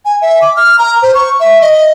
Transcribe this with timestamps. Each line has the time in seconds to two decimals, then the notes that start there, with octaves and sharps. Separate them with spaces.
0.05 G#5
0.22 E5
0.42 D6
0.57 F6
0.79 A#5
1.02 C5
1.14 C#6
1.40 E5
1.61 D#5